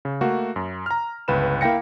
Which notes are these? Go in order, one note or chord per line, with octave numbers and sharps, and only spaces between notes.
C#3
A3 A#3 F#4
F#2
A#5 F6
G1 C#2 B4 B5 E7
A#3 E4 F5 G5 A#6 C#7